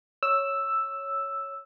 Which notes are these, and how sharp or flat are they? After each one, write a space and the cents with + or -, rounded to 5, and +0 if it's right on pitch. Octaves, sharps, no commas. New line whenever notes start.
C#5 +0 E6 +0